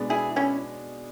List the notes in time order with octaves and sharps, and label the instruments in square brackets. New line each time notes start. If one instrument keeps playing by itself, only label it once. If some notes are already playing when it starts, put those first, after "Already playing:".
Already playing: [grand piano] B2 G#3 B3 D4
[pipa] E4 G#4
C#4 E4